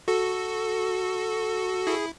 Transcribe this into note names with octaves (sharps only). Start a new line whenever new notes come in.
F#4 A4
E4 G#4